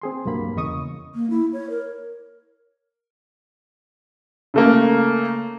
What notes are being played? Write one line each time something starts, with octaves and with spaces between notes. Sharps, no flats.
C4 G#4 C6
C2 G2 F#3 A#3 B5
E2 C#3 D#5 C#6 D#6
A#3
E4
C#5
A#4
C#3 A3 A#3